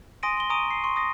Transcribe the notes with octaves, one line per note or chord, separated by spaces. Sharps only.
G#5 C6 D#6 A#6 D7 D#7
C6 G7
G#5 A#5 C#6 D#6 D7 D#7
C7
C6 C#6
D#6 A#6